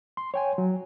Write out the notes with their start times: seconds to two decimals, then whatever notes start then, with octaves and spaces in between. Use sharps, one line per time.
0.17 C6
0.34 C#5 G5 G#5
0.58 F#3